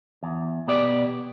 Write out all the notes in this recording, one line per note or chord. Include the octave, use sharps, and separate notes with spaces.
E2
B2 B3 G4 D5